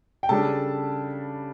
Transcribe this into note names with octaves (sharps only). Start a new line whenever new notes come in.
G5
C#3 G3 D4 A4 A5